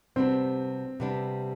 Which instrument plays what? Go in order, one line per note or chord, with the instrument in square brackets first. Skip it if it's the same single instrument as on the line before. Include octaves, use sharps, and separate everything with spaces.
[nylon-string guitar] C3 G3 B3 D4 [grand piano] C4
[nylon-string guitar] C3 G3 B3 D4